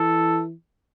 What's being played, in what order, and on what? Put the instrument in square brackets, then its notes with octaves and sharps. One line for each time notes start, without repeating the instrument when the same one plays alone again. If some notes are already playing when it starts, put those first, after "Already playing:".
Already playing: [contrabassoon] E3 [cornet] A4